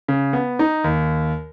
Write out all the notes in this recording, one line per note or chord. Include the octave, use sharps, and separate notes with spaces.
C#3
B3
D#4
D#2